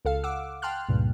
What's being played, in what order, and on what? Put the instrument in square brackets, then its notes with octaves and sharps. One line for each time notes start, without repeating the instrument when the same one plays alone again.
[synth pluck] C#2 A4 F5
F5 F#5 D6 E6
G5 A5 C6 F6 F#6
C#2 G2 A#2